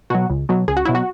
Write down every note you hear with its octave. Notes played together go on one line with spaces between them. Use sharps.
B2 F#3 F#4
C#2
B2 F#3
C#2 G#4
F#4
B2 F#3 E4
F#4